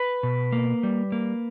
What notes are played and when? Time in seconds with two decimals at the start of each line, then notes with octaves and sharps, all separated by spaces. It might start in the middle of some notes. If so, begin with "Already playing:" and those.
Already playing: B4
0.23 B2
0.52 A#3
0.83 G3
1.12 A#3